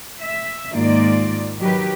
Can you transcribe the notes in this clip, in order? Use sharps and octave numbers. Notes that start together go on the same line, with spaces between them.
E5
G#2 D#3 G#3 A#3 F4 D5
D#3 F#3 G4 B4